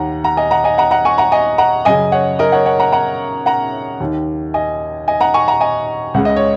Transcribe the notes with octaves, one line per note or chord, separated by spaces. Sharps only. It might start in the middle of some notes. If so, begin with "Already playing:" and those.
Already playing: D#2 D#3 F#5 A#5
F#5 A#5
D#5 G#5
F#5 A#5
D#5 G#5
F#5 A#5
F#5 A#5
G#5 C#6
F#5 A#5
D#5 G#5
F#5 A#5
F#2 C#3 D#5 G#5
C#5 F#5
A#4 D#5
C#5 F#5
C#5 F#5
F#5 A#5
F#5 A#5
F#5 A#5
D#2 D#3
D#5 G#5
D#5 G#5
F#5 A#5
G#5 C#6
F#5 A#5
D#5 G#5
C#2 C#3 F#5
D#5
C#5